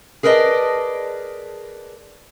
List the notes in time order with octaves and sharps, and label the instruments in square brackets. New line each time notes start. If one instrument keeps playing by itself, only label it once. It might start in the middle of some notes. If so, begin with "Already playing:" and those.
[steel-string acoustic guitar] G#4 A#4 B4 D5 D#5 A5